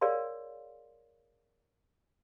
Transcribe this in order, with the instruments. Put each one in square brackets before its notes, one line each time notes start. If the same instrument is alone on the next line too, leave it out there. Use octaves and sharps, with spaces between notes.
[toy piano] G#4 A#4 C#5 D5 F5 C6